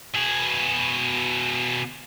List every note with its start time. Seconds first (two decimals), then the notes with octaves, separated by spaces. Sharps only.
0.15 B2 G#4